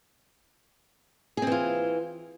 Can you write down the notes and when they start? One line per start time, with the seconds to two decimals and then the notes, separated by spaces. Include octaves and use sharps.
1.37 G#4
1.42 C4
1.47 E3
1.52 F4